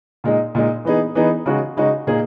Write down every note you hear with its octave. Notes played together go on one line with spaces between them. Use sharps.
A#2 G#3 D#4
A#2 G#3 D#4
E3 B3 D#4 G#4
E3 B3 D#4 G#4
C#3 G#3 D#4 F#4
C#3 G#3 D#4 F#4
A#2 A#3 D#4 G#4